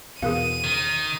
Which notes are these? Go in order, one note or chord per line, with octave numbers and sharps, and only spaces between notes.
E2 B2 G#4 A#4 F5 D#7
D#3